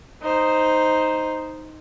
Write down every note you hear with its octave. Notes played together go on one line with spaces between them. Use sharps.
D#4 C5